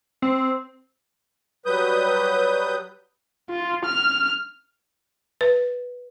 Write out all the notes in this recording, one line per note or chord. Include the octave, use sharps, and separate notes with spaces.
C4
F#3 G3 B4 D#6 G6
F4
F6
B4